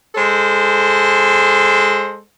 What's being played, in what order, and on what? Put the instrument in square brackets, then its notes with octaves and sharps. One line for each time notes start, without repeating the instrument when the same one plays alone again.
[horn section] G#3 A4 C5